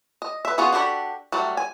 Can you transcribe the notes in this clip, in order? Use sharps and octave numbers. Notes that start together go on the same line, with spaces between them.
D#5
B4 E5
B3 C#4 F4 F#4 G#4
D4 F#4 G4 A4 B5
F#3 G3 A3
G#5